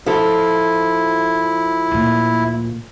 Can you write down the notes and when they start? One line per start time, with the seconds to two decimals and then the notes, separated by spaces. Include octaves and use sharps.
0.06 F3 E4 A4
1.91 D2 A#2